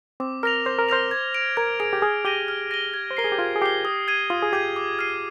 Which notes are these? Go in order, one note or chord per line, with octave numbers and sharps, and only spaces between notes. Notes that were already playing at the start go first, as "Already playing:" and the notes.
C4 D6
A#4 F6 A#6 F7
C5 D6
A#4
C5 F6 A#6 F7
G#6
D7 F7
A#4 G#6
G#4 D7 F7
G4
G#4 F6
G4 A#6 D#7 G7
F6
A#6 D#7 G7
G#6
C5
A#4 C7 G7
G#4
G4
F4 G#6
G#4
G4 C7 G7
D#6
G#6 D#7
F4 D#6
G#4
G4 G#6 D#7
D6
F6 G#6 C7 D#7